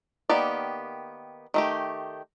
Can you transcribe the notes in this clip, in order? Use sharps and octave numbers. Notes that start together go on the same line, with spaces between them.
D#3 A#3 B3 G4 D5
D#3 A3 G4